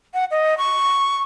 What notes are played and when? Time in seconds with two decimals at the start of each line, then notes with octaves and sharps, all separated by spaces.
0.14 F#5
0.31 D#5
0.58 C#6